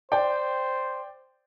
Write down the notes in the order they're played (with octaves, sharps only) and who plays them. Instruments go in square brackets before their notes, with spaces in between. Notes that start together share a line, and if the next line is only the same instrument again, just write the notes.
[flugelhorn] C5 [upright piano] D5 G5